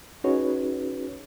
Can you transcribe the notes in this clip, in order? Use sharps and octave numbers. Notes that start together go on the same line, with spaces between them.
C#4 D#4 F#4 G#4 B4 C#5